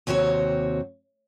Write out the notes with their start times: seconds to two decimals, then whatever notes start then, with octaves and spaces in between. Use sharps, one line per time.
0.07 D#2 C3 C4 F#4 C#5